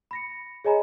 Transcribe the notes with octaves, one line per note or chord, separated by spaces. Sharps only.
B5 A#6 C#7
G#4 C#5 D#5 G#5 A#5 B5